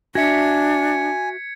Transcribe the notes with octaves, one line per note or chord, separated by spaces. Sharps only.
D4 F#4 E5 G#5 G#6 B6 C#7